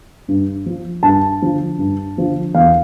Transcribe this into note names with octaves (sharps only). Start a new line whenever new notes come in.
G2
F3
G2 A5
D3 F3
G2
D3 F3
E2 F5